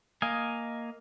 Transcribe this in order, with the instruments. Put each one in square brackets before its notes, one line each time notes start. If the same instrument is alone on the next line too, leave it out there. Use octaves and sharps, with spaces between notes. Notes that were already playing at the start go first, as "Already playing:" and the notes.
[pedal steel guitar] A#3 D#5 F5 G#5